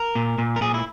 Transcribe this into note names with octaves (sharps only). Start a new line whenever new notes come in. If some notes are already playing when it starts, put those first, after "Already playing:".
Already playing: A#4
A#2
A#2
A#4
A#2 G#4
E4